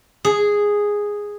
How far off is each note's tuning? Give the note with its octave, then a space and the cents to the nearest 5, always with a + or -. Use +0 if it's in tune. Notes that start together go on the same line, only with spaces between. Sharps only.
G#4 -5